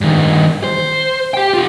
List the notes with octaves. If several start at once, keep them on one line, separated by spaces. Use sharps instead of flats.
G2 D#3
C5
G4 G5
F4 G4